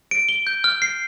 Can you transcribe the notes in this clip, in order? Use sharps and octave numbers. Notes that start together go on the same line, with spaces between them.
D7
G7
G6
F6
C7